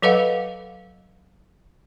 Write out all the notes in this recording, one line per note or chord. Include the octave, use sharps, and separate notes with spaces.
F#3 A4 B4 D#5 F5 F#5